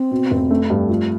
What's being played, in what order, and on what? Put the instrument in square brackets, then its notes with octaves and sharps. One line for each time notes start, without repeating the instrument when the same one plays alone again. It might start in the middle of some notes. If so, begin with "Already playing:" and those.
Already playing: [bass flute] C4
[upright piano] B2
F1
A3
G2
[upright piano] F3 [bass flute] A3